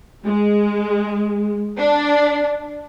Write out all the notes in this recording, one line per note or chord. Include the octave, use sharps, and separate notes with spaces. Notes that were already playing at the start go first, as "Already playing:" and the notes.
G#3
D4